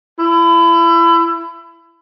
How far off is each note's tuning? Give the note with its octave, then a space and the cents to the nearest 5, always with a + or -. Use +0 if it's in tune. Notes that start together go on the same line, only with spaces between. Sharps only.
E4 +30